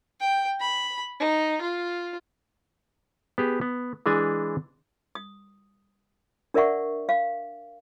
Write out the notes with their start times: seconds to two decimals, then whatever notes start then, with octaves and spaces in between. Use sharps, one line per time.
0.20 G5
0.60 B5
1.20 D#4
1.61 F4
3.38 B3 G4 G#4
3.61 B3
4.06 E3 G#3 D4 G#5
5.15 D#6
6.54 D4 A#4 D5 E5 F#5 C#6
7.09 F5